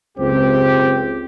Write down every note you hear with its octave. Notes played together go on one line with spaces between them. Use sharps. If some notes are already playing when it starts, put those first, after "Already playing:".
F#1 C#2 C4 G4